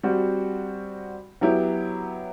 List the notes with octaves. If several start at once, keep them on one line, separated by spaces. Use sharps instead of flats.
G3 C4 F#4
F#3 B3 E4 G4